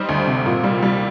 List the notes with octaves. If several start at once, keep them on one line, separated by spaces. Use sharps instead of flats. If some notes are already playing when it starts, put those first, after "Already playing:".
Already playing: G3 D#4 C5 D#5
D2
C3
A#2
G3
G3